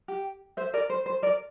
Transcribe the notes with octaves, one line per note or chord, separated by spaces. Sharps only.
G4
C5 E5
A#4 D5
C5
C5
A#4 D5